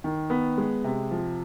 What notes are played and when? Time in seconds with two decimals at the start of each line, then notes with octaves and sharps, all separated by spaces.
0.04 D#3
0.30 B3
0.58 G#3
0.84 C3
1.11 F3